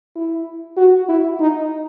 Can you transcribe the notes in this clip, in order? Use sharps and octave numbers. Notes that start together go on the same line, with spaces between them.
E4
F#4
E4
D#4